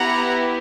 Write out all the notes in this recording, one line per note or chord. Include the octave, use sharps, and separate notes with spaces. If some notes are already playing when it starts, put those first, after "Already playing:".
Already playing: B3 E4 G4 F#5 A#5